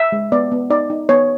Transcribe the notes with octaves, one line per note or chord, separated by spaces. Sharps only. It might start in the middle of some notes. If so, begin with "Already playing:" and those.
Already playing: E5
G#3
B3 D5
B3
D#4 D5
D#4
B3 C#5